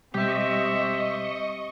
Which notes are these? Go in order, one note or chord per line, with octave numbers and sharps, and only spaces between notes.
B2 G3 G#3 C4 G4 D#5 E5 C#6